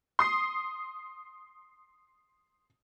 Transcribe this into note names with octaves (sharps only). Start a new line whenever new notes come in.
C6 D#6 C7